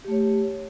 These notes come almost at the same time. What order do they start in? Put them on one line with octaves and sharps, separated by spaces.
G4 A3 C#5